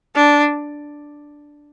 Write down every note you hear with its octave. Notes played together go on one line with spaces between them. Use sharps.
D4